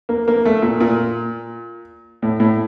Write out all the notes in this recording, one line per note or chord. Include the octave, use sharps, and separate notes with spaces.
A#3
A#3
A3
A#2
A#2
A2
A2